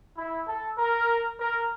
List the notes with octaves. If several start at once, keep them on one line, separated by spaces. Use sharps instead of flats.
E4
A4
A#4
A#4